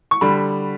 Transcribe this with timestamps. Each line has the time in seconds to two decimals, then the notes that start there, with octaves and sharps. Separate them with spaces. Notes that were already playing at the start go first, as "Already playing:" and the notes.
0.11 C#6
0.21 D3 G3 B5